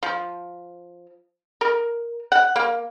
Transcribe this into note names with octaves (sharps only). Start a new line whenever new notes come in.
F3
A#4
F#5
A#3